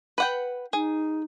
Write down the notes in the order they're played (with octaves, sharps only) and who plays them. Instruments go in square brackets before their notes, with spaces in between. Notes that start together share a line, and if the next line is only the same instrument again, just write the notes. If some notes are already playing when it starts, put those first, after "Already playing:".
[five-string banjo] B4 F#5 G5
[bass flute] D#4 [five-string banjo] G#4